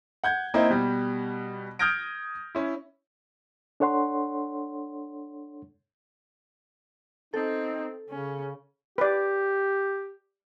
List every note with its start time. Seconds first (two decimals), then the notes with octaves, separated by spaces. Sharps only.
0.24 F#5 G6 G#6
0.54 A#3 C4 D#4 E4
0.70 B2 G3
1.79 D#6 F6 G6 G#6 A#6 D7
2.55 C#4 E4
3.80 D4 A4 C#5 F#5 C6
7.34 C4 D#4 A4
8.09 C#3 C#4
8.98 G4 B4 D5